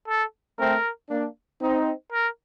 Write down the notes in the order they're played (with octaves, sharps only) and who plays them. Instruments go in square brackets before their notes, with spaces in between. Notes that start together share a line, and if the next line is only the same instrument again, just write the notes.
[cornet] A4
[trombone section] A3 C4 [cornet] A#4
[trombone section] A#3 D4
C4 D#4
[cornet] A#4